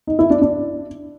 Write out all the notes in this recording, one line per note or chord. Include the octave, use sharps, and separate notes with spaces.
D#4
E4
D4
D4